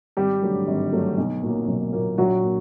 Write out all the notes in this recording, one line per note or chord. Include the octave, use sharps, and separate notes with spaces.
G#1 G3 G4
G2 D3 F#3 A3
G#1
G2 D3 F#3 A3
B1
A#2 F#3 A#3
B1
A#2 F#3 A#3
A#1 F#3 F#4
A#2